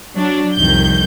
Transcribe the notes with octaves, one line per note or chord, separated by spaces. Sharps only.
F#3 D4
C2 F2 D#3 G6